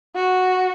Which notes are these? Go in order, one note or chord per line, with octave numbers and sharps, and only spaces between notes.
F#4